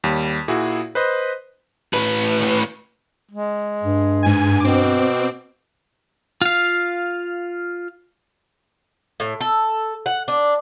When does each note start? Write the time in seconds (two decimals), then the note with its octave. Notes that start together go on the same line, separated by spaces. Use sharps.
0.04 D#2 G3
0.48 A#2 E4 F#4 G#4
0.95 B4 C5 D#5
1.93 A2 B4
3.31 G#3
3.83 G2
4.23 G#2 G#5
4.60 B2 C4 D6
6.42 F4 F5
9.20 A2
9.41 A4
10.06 F#5
10.28 D4